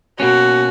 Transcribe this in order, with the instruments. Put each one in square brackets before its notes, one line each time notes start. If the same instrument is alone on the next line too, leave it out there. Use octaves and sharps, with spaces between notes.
[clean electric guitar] B2 A#3 C#4 [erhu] F#4